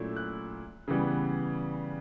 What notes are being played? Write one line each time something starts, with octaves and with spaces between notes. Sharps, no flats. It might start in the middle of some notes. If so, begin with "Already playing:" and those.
Already playing: A#2 F#3 A3 C#4 E4
F#6
C#3 E3 G3 B3